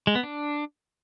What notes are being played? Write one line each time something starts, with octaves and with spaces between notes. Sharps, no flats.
G#3
B3
D4